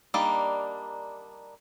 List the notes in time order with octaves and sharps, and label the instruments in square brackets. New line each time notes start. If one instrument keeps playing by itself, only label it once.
[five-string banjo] G3 A#3 D4 D#4